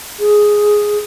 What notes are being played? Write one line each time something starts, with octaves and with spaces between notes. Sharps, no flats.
G#4